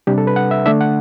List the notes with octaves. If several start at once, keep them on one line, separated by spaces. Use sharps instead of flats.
C3 G3 D4 G4
A4
B4
F#5
E5
D3 A3 D4 E5
F#5